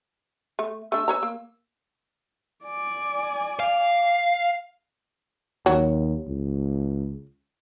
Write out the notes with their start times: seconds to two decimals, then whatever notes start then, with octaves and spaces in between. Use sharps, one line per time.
0.59 A3
0.92 A3 D4 E6
1.08 B4 C#5 A#5
1.23 A#3
2.64 D5 G#5
3.60 F5
5.66 D#2 F#3
6.28 C#2